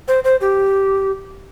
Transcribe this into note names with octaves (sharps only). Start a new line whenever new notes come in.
C5
C5
G4